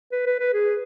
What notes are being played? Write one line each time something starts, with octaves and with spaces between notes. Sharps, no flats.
B4
B4
B4
G#4